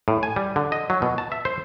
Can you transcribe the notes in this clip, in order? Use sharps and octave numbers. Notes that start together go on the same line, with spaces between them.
A2
G#5
G3
D3
D#5
F#3
B2
A5
E5
C5